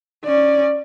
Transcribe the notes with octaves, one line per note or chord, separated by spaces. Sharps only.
C#4 D5